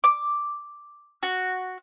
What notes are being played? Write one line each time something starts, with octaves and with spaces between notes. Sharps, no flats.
D6
F#4